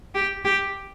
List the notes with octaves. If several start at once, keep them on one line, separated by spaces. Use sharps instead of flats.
G4
G4